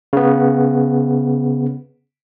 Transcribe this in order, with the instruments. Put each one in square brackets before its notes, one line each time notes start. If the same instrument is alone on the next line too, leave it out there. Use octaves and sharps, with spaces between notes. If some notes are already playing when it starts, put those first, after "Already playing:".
[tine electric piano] C#3 B3